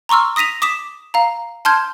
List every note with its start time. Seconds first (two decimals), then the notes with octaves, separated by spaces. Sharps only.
0.09 A#5 C6 C#6 E6 F6
0.36 D#6 A#6 B6 D#7 F7
0.62 D6 D#6 B6 E7
1.14 F5 A#5
1.65 A5 C6 F6 G6 G#6